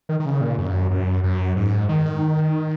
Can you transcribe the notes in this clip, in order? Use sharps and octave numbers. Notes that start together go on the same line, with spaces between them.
D#3
D#3
C#3
A#2
F#2
F#2
F#2
G#2
D#3